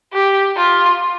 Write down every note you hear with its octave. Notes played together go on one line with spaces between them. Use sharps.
G4
F4